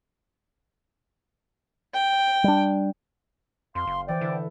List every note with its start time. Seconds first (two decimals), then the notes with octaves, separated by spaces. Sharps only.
1.94 G5
2.44 G3 D4
3.75 F2 F5 C6
3.87 F#1
4.08 E3 C5 D5 G5
4.21 D3 E4 A4